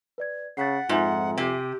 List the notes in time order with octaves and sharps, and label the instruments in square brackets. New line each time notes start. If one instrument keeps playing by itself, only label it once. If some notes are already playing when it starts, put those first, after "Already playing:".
[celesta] B4 D5 G#6
[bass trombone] C#3 [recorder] F#5 [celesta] A6 B6 C7
[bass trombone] F2 [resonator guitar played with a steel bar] G#2 [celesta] F4 E5 G#5
[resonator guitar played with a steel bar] C3 [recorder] G4